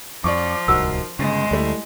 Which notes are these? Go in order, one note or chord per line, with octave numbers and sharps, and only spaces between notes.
F2 F3 D5 C#6 D6
D1 C2 D#4 F#4 A#4 E6
G1 C#3 G#3
D2 G3 A3 E4